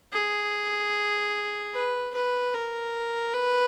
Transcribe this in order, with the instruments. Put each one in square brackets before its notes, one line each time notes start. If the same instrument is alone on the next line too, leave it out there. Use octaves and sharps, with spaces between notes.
[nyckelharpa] G#4
B4
B4
A#4
B4